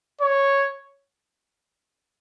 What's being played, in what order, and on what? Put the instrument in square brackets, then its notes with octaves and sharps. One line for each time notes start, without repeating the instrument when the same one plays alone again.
[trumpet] C#5